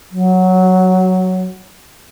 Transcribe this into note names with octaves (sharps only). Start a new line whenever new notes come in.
F#3